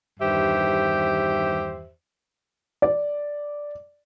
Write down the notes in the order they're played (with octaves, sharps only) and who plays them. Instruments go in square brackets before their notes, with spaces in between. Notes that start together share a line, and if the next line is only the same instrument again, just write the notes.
[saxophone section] E2 G2 D#3 G4 C5 E5
[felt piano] D5